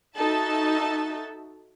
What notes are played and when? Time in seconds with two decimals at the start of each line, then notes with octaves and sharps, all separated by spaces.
0.17 D#4 F#4 A4 E5 A5